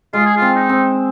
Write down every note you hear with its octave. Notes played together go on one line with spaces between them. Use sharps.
G#3 F4
G#4
F4
C4
D#4
C4